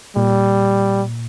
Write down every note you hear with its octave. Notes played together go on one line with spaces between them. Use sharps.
A#2 G3